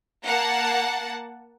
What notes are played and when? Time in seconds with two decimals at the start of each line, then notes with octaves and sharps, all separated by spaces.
0.24 A#3 F#5 A5